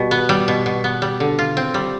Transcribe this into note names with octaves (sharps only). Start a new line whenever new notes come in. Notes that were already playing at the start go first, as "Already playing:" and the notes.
Already playing: B2 G3
B3
G3
B2
B2
B3
G3
D3
F4
C4
G3